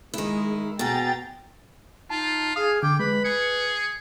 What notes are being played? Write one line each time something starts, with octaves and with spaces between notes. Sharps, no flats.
D#3 G#3 E4
B2 G#4 G5 A#5 A6
D#4 F4 A5
G#4 F5 D#6
D3 G5 D6
G#3 B4 B5
G#4 C#7